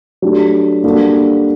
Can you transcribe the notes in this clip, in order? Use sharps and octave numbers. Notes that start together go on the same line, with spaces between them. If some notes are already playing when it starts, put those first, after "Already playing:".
F#3 A3 D4 G4
G3 A#3 D4 F#4 A4